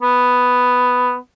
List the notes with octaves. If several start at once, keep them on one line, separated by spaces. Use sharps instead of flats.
B3